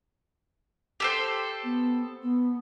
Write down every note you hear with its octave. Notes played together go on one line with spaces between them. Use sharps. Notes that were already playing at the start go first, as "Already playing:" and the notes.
G4 A4 C5
B3
B3